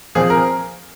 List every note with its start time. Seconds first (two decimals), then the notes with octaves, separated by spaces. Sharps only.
0.15 A#2 F3 C4 G#4
0.30 A#4